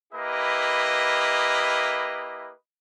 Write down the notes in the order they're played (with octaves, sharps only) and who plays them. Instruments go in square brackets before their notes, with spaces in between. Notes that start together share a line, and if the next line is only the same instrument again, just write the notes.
[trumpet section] A#3 E4 G4 B4 D#5